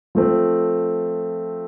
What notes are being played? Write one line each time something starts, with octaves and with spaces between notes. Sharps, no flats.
F3 A3 C4